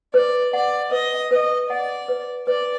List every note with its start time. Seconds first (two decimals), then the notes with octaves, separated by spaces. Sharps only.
0.14 B4 D5
0.53 D5 F#5
0.91 B4 D#5
1.31 B4 D#5
1.70 D5 F#5
2.08 B4
2.47 B4 D5